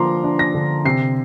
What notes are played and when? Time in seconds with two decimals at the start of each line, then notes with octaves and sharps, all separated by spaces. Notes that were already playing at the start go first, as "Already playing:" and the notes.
Already playing: D3 F3 A#3 A#5 C6 D6
0.24 D4
0.39 A#6
0.54 D3
0.85 C3 C7